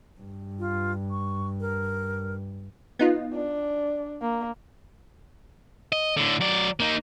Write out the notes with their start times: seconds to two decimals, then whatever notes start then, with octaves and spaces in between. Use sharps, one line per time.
0.21 G2
0.59 F4
1.11 C#6
1.61 A#4
2.99 B3 D#4 F4
3.34 D4
4.22 A#3
5.92 D#5
6.17 A2 D3
6.41 F#3 D5
6.80 A#3 D#4